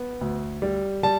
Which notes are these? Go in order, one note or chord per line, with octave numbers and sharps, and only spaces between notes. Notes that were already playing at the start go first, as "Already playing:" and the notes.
Already playing: B3
D2
G3
G3 A5